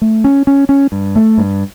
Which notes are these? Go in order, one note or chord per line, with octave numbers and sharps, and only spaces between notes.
A3
C#4
C#4
C#4
G2
A3
G2